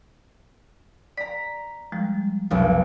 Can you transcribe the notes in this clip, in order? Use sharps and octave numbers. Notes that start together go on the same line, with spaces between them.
D5 A#5 B6
F3 G3 G#3
F1 B1